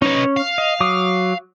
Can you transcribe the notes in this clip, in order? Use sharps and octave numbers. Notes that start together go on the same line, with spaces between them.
C#4 D#4 B4 C#5
F5
D#5
F#3 D6 D#6